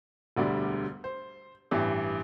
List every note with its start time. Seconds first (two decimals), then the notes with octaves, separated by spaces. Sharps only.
0.37 E1 D2 D3 G3 D5
1.04 C5
1.71 A1 G2 E3 G4